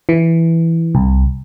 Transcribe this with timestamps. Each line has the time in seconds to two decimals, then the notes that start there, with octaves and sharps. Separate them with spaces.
0.09 E3
0.95 C2